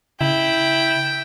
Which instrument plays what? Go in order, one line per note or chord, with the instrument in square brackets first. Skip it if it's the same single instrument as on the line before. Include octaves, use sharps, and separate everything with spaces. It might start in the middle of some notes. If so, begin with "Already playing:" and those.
[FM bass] C#3 [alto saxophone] E4 [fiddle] G5